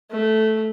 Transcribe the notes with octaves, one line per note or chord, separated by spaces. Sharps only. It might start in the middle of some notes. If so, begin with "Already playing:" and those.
A3